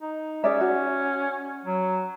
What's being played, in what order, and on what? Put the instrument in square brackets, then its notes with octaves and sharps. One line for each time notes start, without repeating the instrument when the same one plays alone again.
[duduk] D#4
[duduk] C#4 [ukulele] G#4 D5 E5
[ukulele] F#4
[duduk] F#3